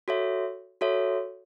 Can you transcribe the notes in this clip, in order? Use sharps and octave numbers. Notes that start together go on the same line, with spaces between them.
F#4 A4 C#5 E5
F#4 A4 C#5 E5